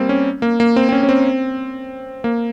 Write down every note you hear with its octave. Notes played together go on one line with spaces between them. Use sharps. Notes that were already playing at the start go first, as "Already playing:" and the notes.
Already playing: G3 A#3 C4
C#4
A#3
A#3
C4
C4
C#4
C#4
C4
A#3